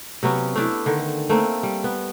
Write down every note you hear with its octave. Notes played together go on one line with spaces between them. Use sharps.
C3 F#3 B3 C#4
A3 D4 E4
D3 D#3
A3 A#3 C4
G3
B3